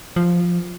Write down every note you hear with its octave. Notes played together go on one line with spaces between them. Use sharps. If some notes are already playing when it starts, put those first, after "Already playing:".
F3